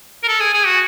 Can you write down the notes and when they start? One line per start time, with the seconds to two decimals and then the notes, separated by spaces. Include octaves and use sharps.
0.24 A#4
0.28 A4
0.40 G#4
0.54 G#4
0.66 F#4